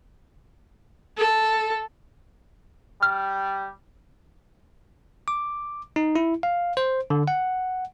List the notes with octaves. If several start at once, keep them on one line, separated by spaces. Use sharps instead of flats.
A4
G3 F6
D6
D#4
E4
F5
C5
D3
F#5